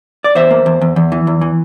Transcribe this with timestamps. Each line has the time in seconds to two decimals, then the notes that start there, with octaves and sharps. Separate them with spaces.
0.24 D5
0.35 E2 C5 E5
0.51 A#3
0.66 E2
0.81 E2
0.96 E2
1.12 E3
1.27 E2
1.41 E3